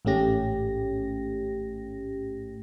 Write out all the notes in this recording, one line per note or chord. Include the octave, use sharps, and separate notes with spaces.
A1 G#2 A3 C#4 G4 A#6